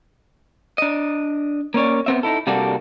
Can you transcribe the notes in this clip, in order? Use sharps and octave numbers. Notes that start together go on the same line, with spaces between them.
D4 D#5
A#3 C#4 C#5 D5
B3 C4 E5
D#4 E4 A4
C3 G3 A#3 D4 F#4 A4